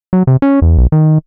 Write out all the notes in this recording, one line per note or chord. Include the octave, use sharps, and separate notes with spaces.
F#3
C3
C#4
E2
B1
D#3